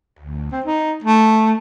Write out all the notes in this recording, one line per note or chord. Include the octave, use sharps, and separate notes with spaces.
D2
C4
D#4
A3